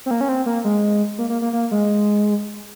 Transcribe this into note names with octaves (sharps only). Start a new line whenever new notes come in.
C4
A#3
C#4
C4
A#3
G#3
A#3
A#3
A#3
A#3
G#3